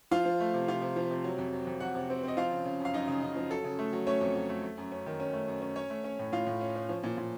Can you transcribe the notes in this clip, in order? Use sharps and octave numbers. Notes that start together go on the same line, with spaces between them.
F3 F4 F5
F3
A3
C3
C3 F4 F5
C3
F3
C3
F#3
F2
F#3
F2
F2 F#4 F#5
C3
C4
C4 D#5
F3 F4 F5
C#3
C#3
F#2
F5
F#2 D#4 D#5
C#3
C#3
F3
F#3 A4
C#3
A3
F#3
A3 C#4 C#5
F2
F#3
A3
A3
F#2
C#4
D#3
C#4
A3
F#2
C#4
C#4 C#5
A3
C#4
A2
A2 F4 F5
A2
C#4
C#4
F3
A#2
A#2